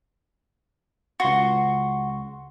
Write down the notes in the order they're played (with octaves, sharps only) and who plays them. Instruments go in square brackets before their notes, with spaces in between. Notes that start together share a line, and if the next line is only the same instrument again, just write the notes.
[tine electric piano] C#2 C6 C#6 [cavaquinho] F#4